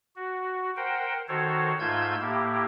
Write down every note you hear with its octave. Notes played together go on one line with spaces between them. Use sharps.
F#4
A#4 C5 F#5 G5
D#3 F#4 A4 C5 C#5
G#2 A3 F4 E6 G6 G#6
A2 A#3 E4 G4